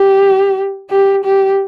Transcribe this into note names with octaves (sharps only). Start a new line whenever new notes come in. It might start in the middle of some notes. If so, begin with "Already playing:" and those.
Already playing: G4
G4
G4